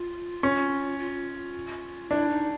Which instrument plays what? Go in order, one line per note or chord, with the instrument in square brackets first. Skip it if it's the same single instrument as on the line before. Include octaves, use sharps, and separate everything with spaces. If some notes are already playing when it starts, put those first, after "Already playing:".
Already playing: [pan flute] F4
[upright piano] C#4
[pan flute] F4
[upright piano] D4 [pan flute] E4
[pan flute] D#4